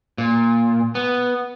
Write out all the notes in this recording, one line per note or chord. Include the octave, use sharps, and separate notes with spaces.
A#2
B3